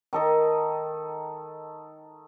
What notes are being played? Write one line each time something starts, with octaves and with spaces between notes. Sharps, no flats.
D#3 A4 D#5